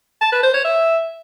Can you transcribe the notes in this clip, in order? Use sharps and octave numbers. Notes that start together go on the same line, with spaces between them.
A5
B4
C5
C#5
E5